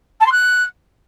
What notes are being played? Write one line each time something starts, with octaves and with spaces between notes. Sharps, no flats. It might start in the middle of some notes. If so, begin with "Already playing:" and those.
A5
C6
F#6